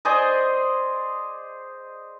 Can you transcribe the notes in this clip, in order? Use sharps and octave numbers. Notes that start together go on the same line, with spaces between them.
G#4 C5 D5 D#5